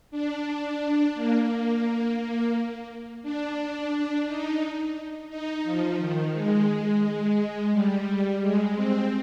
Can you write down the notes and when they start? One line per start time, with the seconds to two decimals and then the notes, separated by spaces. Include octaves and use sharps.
0.11 D4
1.15 A#3
1.49 A#3
2.18 A#3
3.23 D4
4.26 D#4
5.29 D#4
5.64 F3
5.98 D#3
6.33 G#3
7.02 G#3
7.72 G3
8.41 G#3
8.76 C4